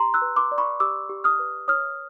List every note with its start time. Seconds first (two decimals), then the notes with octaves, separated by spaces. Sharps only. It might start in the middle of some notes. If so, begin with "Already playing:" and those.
Already playing: G4 A#5 C6
0.14 E6 F#6
0.22 B4
0.36 C6 D6
0.52 D5
0.58 B5 C#6
0.80 G4 D6 E6
1.09 G4
1.24 D#6 F6
1.39 B4
1.68 C#5 D#6 F6